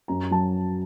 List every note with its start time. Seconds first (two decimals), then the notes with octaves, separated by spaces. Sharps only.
0.08 F#2 A#5
0.31 F#3 A5